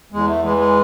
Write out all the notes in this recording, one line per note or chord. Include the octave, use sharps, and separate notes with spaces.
E2 G#3
A3
E3 G#3
G#3